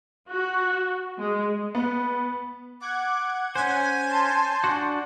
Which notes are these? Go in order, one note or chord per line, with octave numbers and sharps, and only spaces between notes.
F#4
G#3
B3
F#5 D6 G#6
C#4 C5 G#5
A5 C6 G6
D4 F#4